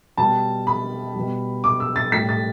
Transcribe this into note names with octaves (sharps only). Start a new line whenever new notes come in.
B2 G3 A5
B5
B2 G3
D6
E6
A6
A2 G3 B6
A6